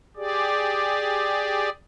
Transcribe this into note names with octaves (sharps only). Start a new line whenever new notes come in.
G4 G#4 D5